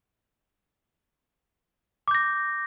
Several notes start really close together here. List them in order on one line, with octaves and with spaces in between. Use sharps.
D6 G6 A#6